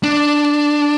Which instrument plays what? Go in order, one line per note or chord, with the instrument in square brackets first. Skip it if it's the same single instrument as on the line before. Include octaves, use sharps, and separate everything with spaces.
[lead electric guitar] D4